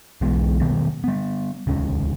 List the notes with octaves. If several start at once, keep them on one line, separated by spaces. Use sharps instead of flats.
B1 B2 E3 G#3
B2 D#3 G3 B3
G3 B3
D#1 C#2 C#4